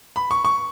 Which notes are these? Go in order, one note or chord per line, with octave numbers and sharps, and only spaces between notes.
B5
C#6
C#6